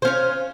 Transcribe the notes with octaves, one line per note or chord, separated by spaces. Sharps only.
C#4 F4 C5